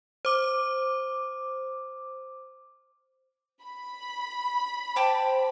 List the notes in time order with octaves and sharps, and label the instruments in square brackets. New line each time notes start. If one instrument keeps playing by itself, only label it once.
[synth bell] C5 D6
[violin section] B5
[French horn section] C5 [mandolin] G5 A5 D6